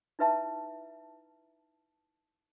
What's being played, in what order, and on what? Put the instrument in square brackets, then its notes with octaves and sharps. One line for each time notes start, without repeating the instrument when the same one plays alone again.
[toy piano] D#4 E4 B4 E5 A5 A#5